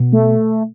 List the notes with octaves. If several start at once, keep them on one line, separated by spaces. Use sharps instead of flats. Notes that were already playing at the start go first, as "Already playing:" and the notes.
Already playing: B2
A3